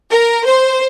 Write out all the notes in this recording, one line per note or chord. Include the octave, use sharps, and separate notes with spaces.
A#4
C5